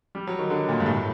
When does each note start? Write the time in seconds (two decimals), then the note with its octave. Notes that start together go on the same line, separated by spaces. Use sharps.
0.15 G3
0.27 F#3
0.39 D#3
0.50 D3
0.69 A#2
0.80 G2
0.86 A2